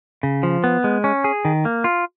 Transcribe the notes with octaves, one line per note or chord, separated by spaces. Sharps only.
C#3
F3
B3
G#3
C#4
G#4
D#3
A#3
F4